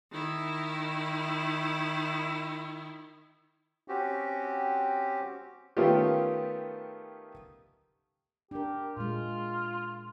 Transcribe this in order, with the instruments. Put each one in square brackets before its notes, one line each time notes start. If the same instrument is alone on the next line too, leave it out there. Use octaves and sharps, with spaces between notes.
[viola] D#3 E4
[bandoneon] C4 C#4 F#4 G4
[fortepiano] D#3 A3 B3 C#4 F4 G4
[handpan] D4 A#4 [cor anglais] G4
[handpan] A#2 G#3 [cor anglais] F4